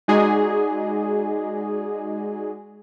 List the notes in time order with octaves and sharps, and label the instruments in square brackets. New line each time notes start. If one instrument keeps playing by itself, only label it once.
[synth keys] G#3 D#4 F#4 G#4 D5 D#5